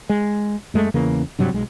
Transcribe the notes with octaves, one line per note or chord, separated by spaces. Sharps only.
G#3
F#2 G#3 A3
E2 C#3 E3 A#3
G2 C3 F#3 G3
B1 G#3